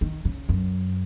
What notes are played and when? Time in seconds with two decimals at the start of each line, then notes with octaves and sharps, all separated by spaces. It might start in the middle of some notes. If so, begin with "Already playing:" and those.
0.01 D#3
0.25 C#3
0.49 F#2